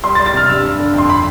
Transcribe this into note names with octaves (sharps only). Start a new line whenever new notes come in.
G3 C6
A6
G3
A6
C3 F6
G2 E6
D4
D3
F2 C6
B5